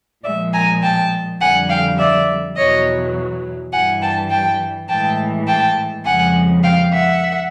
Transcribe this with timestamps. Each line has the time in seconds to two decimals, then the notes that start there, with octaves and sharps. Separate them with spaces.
0.24 A#2 F3 G#3 D5 E5
0.53 G#5 A#5
0.82 G5 A5
1.40 F2 D3 G3 F#5 G#5
1.69 F5 G5
1.98 D5 E5
2.56 E2 B2 F#3 C#5 D#5
3.72 G2 E3 G3 F#5 G#5
4.01 G5 A5
4.30 G5 A5
4.88 A2 E3 G#3 G5 A5
5.47 G5 A5
6.05 F2 C#3 F3 G#3 F#5 G#5
6.63 F5 G5
6.92 E5 F#5